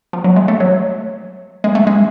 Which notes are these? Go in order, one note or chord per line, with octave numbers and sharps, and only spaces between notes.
F3
F#3
G#3
A3
F#3
G#3
A3
G#3